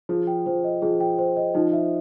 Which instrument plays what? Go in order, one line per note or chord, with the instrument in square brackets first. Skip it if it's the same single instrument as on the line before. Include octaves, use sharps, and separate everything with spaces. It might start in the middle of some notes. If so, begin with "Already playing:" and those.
[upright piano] F3 [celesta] G#4
[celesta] G5
[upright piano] F3 [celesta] C5
[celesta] D#5
[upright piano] F3 [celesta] G#4
[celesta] G5
C5
D#5
[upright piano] F3 [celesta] D#4
[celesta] E5